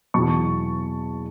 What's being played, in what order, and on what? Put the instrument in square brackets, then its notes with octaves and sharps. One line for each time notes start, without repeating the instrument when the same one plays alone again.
[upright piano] E2 B2 F#3 A5 C#6